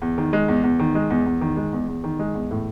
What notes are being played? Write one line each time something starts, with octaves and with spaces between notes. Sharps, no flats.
E2
D#3
G#3
E2
E2
D#3
G#3
E2
E2
D#3
G#3
E2
E2
D#3
G#3
E2
A2